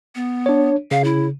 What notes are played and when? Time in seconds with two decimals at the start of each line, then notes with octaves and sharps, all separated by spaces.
0.15 B3
0.46 D4 C#5
0.91 C#3 F5
1.04 E4